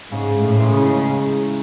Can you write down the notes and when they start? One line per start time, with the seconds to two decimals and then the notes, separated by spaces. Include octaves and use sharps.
0.12 G#2 C#3
0.42 A2
0.58 E3 G#3 D#4
0.73 C#3
1.04 C#3